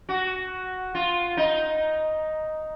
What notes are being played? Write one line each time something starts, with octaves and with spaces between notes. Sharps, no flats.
F#4
F4
D#4